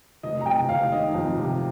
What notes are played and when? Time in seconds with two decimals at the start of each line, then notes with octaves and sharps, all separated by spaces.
0.23 F1 D#5
0.41 A#5
0.46 C3 G5
0.69 F1 F5
0.92 D#3 D#5
1.14 F2
1.37 C3